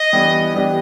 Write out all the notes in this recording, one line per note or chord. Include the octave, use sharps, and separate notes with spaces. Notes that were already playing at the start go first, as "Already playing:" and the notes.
Already playing: D#5
E3 G3 B3 D4 G4
E3 G3 B3 D4 G4